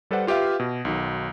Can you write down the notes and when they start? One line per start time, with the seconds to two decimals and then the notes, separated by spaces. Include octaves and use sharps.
0.11 G3 A4 B4 C5 D5 F#5
0.27 F4 G4 B4 E5 F5
0.60 B2
0.85 B1 D#3 F#3